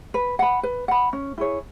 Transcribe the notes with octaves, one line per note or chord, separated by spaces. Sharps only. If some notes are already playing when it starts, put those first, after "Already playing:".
B4
F#5 B5
B4
F#5 B5
C#4
E4 G#4 C#5